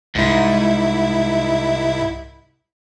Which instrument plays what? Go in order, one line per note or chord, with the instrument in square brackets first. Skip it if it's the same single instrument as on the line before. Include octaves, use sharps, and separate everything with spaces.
[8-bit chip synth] C2 E4 [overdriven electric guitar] G#2